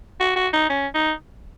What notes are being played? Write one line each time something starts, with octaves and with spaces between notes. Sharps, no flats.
F#4
F#4
D#4
C#4
D#4